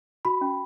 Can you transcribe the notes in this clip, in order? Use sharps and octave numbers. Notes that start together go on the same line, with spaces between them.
F#4 B5
C#4